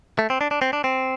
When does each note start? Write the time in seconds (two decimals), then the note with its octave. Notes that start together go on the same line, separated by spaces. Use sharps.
0.19 A3
0.30 C4
0.41 D4
0.51 D4
0.62 C4
0.73 D4
0.84 C4